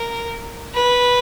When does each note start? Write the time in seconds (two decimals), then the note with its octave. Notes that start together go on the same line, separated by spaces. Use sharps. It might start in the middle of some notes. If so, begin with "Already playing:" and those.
Already playing: A#4
0.75 B4